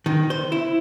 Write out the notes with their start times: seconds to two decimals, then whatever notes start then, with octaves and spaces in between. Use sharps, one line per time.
0.06 D#3
0.30 C5
0.52 E4